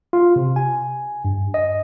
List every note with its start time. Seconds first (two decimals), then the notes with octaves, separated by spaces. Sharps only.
0.13 F4
0.36 C3
0.56 G#5
1.25 G2
1.54 D#5